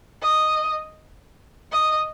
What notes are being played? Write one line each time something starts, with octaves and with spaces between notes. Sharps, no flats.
D#5
D#5